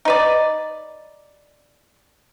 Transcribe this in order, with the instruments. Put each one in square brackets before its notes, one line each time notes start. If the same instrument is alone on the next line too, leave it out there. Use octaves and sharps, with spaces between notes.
[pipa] D#4 B4 D5